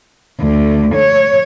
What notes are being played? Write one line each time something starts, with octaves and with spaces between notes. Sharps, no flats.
D2
C#5